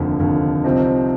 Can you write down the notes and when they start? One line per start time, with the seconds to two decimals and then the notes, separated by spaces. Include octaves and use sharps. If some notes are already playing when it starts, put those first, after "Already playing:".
Already playing: F1 D#2 D3 F3
0.20 F1 D#2 D3 F3
0.64 C2 C3 F3 C4 D#4